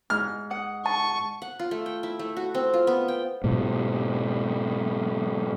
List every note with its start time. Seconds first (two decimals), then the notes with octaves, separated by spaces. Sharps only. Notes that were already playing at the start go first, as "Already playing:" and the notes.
0.10 G#2 F6
0.50 F#5 D#6 F#6
0.86 A5 C#6
1.42 F#5
1.60 F4
1.71 A3
1.86 G5
2.03 E4
2.19 A3
2.37 F#4
2.55 C4
2.74 F4
2.87 B3
3.08 G5
3.44 G#2 B2